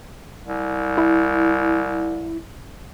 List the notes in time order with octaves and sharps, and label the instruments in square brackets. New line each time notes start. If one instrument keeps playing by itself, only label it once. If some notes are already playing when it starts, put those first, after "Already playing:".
[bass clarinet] C2
[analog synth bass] E4